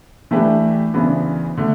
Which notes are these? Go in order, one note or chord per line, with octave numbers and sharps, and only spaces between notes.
E3 A3 D4 G4 B4
D2 C#3 E3 B3 D4
D3 A3